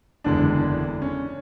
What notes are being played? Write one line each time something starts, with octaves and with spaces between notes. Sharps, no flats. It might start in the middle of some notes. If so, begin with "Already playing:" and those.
F#1 E2 D3 G#3 D4
C#4